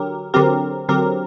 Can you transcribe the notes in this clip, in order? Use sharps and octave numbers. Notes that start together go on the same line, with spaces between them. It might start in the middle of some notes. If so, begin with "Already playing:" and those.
Already playing: D3 F#3 G4 A#4
D3 F#3 C4 G4 A#4
D3 F#3 C4 G4 A#4